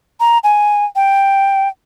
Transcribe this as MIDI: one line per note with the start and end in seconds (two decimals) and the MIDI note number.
0.20 0.38 82
0.44 0.85 80
0.96 1.69 79